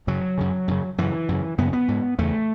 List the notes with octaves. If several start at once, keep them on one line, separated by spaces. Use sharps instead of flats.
F#2 C#3 F#3
F#2 C#3
F#2 C#3
F#2 C#3 E3
F#2 C#3
F#2 C#3 B3
B3
G#2
E2 C#3 A3